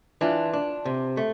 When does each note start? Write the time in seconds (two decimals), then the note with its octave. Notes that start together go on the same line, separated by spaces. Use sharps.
0.21 E3 D4 F4
0.53 D4
0.85 C3
1.17 A3